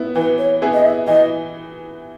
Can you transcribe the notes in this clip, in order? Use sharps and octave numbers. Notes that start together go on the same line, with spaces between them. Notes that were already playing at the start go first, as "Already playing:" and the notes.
Already playing: B3 E4
E3 B4
C#5
B3 E4 G#4
D#5
E5
E3 D#5